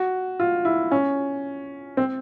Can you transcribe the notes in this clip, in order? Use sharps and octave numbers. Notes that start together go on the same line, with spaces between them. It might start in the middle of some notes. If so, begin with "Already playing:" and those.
Already playing: F#4
F4
E4
C#4
C4